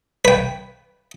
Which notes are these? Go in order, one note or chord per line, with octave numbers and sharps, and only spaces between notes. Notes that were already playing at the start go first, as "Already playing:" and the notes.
B4 G5